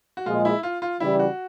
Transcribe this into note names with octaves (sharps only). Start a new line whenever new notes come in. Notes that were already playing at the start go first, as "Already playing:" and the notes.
F#4
A#2 F3 G#3 F4
E4
F4
F4
C#3 E3 G3 E4
F#4